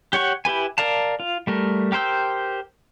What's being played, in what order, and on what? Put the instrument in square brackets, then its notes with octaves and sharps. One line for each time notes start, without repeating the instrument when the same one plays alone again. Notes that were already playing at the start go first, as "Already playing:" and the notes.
[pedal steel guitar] G4 C#5 F#5 C#6
E4 G4 B4 G#5
A#4 D5 F5 A5
F4
G3 A3 A#4
G4 A#4 C5 G5 E6